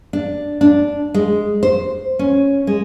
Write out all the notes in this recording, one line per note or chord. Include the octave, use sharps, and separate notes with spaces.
D4
D4
G#3
C5
C#4
G#3